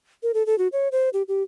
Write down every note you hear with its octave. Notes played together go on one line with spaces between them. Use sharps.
A#4
A4
A4
F#4
C#5
C5
G4
G4